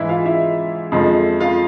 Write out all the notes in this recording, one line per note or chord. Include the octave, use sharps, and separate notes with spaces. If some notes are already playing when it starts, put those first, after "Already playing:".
Already playing: G#2 E3 G#3 E4 E5
F4 F5
E4 E5
F2 D3 F3 G#3
F4 F5